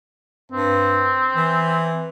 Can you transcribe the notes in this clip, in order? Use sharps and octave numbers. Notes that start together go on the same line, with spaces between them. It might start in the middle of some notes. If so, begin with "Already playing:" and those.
G2 C4
E3